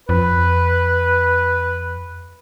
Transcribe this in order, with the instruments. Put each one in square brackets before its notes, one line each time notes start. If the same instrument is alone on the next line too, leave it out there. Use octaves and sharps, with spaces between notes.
[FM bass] F2 [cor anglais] B4